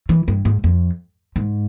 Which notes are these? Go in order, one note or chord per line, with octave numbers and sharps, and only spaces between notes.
E3
G2
G#2
F2
G#2